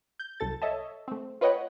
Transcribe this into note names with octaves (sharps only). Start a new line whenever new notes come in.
G6
C2 F#2 A4 A6
A4 C#5 D#5 E5 A5
A3 C4
F4 B4 C#5 D#5 F#5 G5